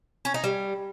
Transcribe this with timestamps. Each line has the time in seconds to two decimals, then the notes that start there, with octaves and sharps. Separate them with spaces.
0.25 C#4
0.34 D#4
0.44 G3